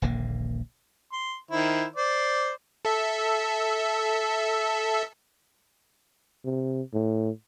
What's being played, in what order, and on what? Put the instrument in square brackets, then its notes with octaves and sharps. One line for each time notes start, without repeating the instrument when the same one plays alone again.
[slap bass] D#1 A#1 D3 A#3
[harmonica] C6
D#3 E4 C5
C5 D5
[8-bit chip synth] A4 E5
[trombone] C3
A2